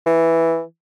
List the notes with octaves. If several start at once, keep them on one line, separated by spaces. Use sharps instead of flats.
E3